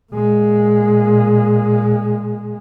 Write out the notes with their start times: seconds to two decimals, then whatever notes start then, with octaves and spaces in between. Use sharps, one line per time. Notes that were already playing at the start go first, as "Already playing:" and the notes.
0.12 A#2 G#3